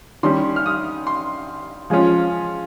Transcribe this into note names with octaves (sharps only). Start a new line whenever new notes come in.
D#3 G3 C#4 C6
F6
D#6
C6
F3 G#3 C#4 F4